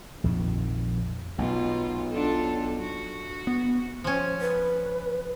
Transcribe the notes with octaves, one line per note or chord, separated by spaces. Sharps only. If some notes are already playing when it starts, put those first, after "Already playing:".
A#1 F2 D#3
B1 B2 F4
D4 F4 A4
F#4
B3
F3 C#4
B4